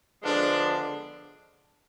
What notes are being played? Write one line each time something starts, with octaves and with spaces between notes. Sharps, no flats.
D3 F3 G#3 B3 D4